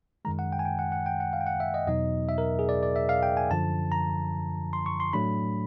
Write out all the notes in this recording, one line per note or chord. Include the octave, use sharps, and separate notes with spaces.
F#2 D#3 G#3 A#5
F#5
G5
G#5
G5
F#5
F#5
G5
F#5
F5
G5
F#5
E5
D#5
E2 B2 F#3 B3 D#4 D#5
E5
A#4
G#4
D5
D5
E5
F5
G5
G#5
F#2 D3 F3 A5
A#5
C6
C#6
C6
A2 F#3 A3 D4 B5